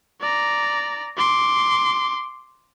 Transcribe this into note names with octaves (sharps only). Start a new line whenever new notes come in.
D5 A#5
C6 D6